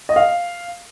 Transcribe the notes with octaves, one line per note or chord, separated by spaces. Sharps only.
D#5
F5